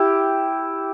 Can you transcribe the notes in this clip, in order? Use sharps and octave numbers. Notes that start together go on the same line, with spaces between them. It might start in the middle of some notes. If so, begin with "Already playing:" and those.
Already playing: E4 G4